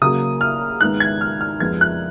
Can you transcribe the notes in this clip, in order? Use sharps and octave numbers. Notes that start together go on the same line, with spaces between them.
C#3 F#3 A#3 D#6
F6
G#2 D#3 G#3 B3 F#6
G#6
F6
F6
F2 F3 G#3 B3 G#6
F#6